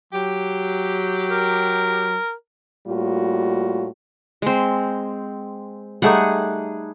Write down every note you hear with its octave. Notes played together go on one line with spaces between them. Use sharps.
F#3 G4
A#4
A2 G3 A#3 F4 F#4
G#3 C4
G3 A3 D#4 G#4 F#5